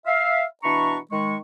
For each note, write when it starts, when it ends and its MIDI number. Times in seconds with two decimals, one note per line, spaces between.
0.06 0.43 76
0.06 0.43 77
0.63 0.97 47
0.63 0.97 52
0.63 0.97 62
0.63 0.97 82
0.63 0.97 83
0.63 0.97 85
1.11 1.37 51
1.11 1.37 56
1.11 1.37 85